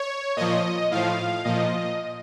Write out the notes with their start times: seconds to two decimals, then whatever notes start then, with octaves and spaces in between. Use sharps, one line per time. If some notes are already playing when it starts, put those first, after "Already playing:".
Already playing: C#5
0.36 A#2 F3 D#5
0.91 A2 F3 F5
1.45 A#2 F3 D#5